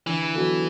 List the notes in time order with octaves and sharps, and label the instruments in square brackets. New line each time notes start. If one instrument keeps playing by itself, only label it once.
[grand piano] D3 [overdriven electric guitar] E3
[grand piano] F#3 B3 F#4 A4